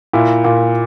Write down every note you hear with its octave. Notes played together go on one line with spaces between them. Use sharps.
A#2 E4
A#2